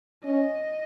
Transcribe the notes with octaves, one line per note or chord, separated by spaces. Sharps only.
C#4 D#5